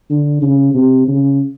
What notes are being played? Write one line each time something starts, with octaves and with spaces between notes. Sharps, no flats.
D3
C#3
C3
C#3